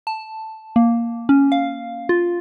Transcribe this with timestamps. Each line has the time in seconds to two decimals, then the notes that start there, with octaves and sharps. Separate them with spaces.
0.07 A5
0.76 A#3
1.29 C#4
1.52 F5
2.09 F4